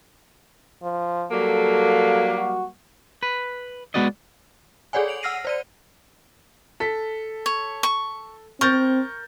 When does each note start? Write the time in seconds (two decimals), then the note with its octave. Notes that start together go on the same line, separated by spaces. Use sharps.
0.83 F3
1.31 F#3 G3 A#3 A4
2.37 F#4
3.23 B4
3.94 G#3 B3 F#4 D5 D#5
4.93 G#4 A4 C#5 D5 F#5 G#5
5.08 D7 F7 F#7
5.23 F#5 E6 F6 A#6 C7 D#7
5.45 C5 D5 D#7
6.80 A4 B6
7.46 C#5
7.83 C#6
8.61 C4 A#4 C#6 G6 A6